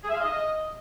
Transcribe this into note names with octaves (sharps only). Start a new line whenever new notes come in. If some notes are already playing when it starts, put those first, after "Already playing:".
G#4
E5
F5
D#5